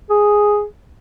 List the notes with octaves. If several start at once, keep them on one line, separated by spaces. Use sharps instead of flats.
G#4